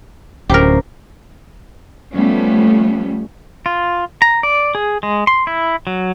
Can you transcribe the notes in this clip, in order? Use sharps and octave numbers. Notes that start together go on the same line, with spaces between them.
D1 C#4 G4 A#4 C5 A#5
F3 G3 A3 B3 C#4
F4
A#5
D5
G#4
G#3
C6
E4
F#3